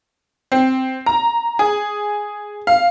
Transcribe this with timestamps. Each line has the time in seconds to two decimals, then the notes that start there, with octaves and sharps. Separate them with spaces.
0.52 C4
1.06 A#5
1.59 G#4
2.67 F5